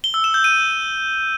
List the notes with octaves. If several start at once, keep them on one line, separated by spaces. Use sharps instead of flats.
G7
E6
E7
G6
D#7